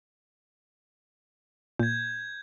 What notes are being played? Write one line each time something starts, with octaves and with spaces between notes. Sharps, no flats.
A#2 G6 G#6